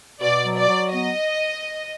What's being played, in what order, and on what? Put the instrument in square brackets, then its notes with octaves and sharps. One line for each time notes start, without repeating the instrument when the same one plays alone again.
[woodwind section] B2 [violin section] D5
[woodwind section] F#3
[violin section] D5
[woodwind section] F#3
[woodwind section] B3 [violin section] D#5